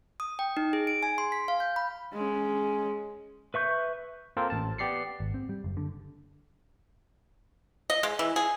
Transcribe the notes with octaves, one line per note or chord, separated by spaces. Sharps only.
D#6
G5
D#4
G#4
D7
G#5
C6
B6
F5
G6
B5
G#3 C#4
B4 E5 C#6 G6
A#3 C4 F4 A4 A#4 C5
A1 A5
B3 G4 D5 C7 C#7
G#1
C4
G3
F#1
D3
D#5
G#3
E3
G#4